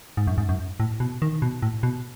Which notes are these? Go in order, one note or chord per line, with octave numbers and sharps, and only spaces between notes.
G#2
F#2
G#2
F#2
A2
B2
D#3
B2
A2
B2